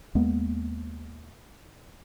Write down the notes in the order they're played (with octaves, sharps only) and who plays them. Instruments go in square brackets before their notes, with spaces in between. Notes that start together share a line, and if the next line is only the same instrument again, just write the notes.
[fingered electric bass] D#2 G#3 A#3 B3